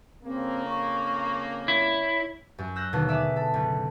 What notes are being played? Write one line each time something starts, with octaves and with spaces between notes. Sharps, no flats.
F2 C#3 A#3 C4
C#6
E4 C#5
F#2
E6 F#6 G6 A#6
D#2 B2 D3
G#4 D5 E5
A4
F#1